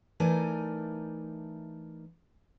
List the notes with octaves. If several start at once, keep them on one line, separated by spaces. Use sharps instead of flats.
E3 A3 D#4 A#4 D5 G#5